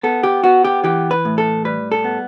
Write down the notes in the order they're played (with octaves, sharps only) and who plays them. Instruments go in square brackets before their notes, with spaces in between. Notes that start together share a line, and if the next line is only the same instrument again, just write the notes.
[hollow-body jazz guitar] B3 A4
G4
B3 F#4
G4
E3 G4
B4
A2
A4
G3 B4
A4
B3